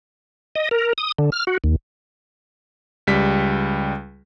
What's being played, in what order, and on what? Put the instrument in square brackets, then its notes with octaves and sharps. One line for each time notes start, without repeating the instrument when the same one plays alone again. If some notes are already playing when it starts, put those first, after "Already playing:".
[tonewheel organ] D#5
A#4
D#6
D3
F6
F#4
D#2
[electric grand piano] C#2 G3 B6